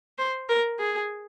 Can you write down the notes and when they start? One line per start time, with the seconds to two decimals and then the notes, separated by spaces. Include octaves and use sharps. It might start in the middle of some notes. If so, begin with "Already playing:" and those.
0.18 C5
0.49 A#4
0.79 G#4